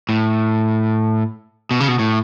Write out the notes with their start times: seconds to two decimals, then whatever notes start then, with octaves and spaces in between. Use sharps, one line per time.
0.09 A2
1.71 B2
1.80 C#3
1.88 B2
1.99 A2